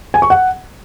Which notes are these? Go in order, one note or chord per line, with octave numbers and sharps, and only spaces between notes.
G#5
C#6
F#5